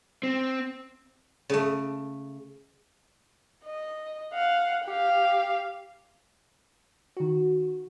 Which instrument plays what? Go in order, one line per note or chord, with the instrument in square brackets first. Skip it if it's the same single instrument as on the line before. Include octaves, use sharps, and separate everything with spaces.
[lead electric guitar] C4
[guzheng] C#3 A3
[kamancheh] D#5
F5 F#5
G4 F5
[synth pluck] D#3 F#4